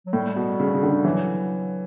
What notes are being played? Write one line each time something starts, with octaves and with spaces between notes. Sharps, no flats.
F#3
A2 G3
B2
C#3
C#3
D3
E3 F#3